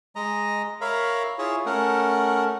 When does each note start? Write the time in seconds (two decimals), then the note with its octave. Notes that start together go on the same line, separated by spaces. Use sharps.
0.16 G#3 D#5 A#5
0.81 A#4 C#5 E5 F5 A#5 B5
1.38 E4 F4 G#4 C#5
1.66 A3 C#4 A#4 F#5